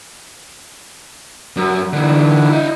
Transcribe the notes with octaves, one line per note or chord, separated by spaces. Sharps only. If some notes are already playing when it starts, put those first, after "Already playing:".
F#2
D3 E3
E4 D#5